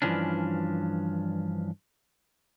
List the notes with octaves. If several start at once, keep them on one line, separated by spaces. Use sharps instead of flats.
G2 B2 E3 F3 C#4 D4